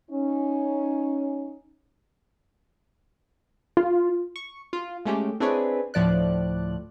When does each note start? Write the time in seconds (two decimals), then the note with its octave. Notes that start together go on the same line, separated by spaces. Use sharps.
0.11 C#4 D#4
3.77 F4
4.36 C#6
4.73 F4
5.05 G#3 A3 C#4 G4
5.40 C4 D4 E4 G#4 B4 C#5
5.94 D2 A2 F3 D5 F#6